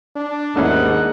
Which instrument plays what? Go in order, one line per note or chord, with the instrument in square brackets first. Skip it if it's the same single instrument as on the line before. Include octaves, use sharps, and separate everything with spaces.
[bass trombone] D4
[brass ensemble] D#2 G#2 [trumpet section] G3 D#4 F#5 [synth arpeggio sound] A3 C#4 E4